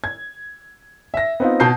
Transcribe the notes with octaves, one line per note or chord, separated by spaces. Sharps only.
G#6
E5 A#6
B3 C4 D#4 F4
B2 A5 G6 C7